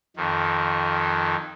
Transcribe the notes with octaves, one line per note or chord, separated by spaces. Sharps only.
F2 D#3